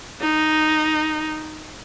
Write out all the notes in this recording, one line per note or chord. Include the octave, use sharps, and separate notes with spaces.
D#4